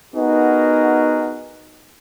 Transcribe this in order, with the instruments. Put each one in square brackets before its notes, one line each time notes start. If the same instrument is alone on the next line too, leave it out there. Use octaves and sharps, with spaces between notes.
[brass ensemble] B3 D#4 F#4 G#4 A#4